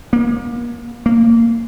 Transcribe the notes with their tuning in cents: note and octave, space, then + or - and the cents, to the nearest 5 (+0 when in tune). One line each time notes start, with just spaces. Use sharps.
A#3 +35
A#3 -20